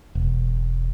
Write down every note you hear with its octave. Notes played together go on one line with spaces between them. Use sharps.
E1